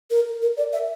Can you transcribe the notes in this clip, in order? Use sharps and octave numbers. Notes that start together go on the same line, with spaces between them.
A#4
A#4
D5
E5